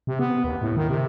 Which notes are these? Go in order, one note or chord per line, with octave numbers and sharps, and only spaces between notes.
C3
B3
D#2
A2
D#3
C3